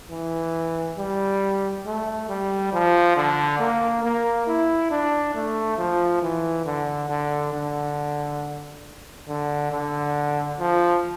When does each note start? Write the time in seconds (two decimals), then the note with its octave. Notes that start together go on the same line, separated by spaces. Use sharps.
0.11 E3
0.98 G3
1.86 A3
2.29 G3
2.73 F3
3.16 D3
3.59 A#3
4.03 A#3
4.47 E4
4.91 D4
5.35 A3
5.78 F3
6.22 E3
6.65 D3
7.10 D3
7.53 D3
9.27 D3
9.72 D3
10.59 F3